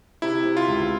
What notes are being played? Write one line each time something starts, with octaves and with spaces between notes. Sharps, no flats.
C3 E4
C3
F4
C#2